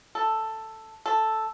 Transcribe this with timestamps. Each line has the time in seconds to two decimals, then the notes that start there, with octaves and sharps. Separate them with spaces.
0.15 A4
1.06 A4